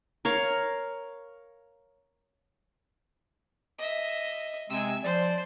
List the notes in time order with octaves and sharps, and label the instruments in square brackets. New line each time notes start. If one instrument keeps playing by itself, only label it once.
[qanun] A#4 C#5 F5
[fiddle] D#5 E5
[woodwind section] C3 G#3 C4 [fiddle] G#5 E6
[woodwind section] F3 D5 [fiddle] C5